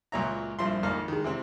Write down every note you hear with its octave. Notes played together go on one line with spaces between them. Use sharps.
C#2 A#2 F#3 C#5 E5 A#5
A#1 G2 F3 E4 C6
G#1 F2 A#3 F6
D#3 G#3
C3 E3 C4